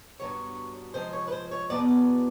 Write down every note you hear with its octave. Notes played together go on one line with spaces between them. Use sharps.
G2 D3 F#3 B3 C#5
C3 F3 G#3 C5
C#5
B4
C5
C#5
E2 B2 F#3 B3 D5
D5